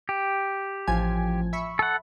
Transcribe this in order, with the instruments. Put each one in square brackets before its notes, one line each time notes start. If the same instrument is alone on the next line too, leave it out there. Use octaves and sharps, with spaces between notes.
[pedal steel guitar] G4
[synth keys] A1 F3 G#5
E5 B5 C#6
[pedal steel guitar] A4 F#5